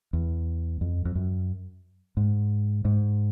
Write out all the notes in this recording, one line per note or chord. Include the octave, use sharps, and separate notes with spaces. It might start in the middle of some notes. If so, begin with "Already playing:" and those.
E2
F2
F2
F#2
G#2
G#2